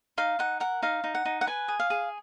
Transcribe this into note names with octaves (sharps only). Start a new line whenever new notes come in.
D#4 F5
D#4 F#5
A#4 F#5
D#4 F5
D#4
F#5
D#4
F#5
B4 G#5
G#4
F5
G#4